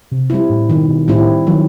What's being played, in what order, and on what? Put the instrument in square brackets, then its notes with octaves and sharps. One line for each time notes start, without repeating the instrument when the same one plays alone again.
[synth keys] C3
[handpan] G3 C4 E4
[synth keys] A2
[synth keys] B2 [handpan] D#3
[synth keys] B2
[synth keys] A2 [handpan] G3 C4 E4
[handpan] D#3 [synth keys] F#3